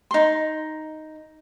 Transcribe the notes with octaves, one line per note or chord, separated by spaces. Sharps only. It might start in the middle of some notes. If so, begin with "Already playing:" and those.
D#4 C6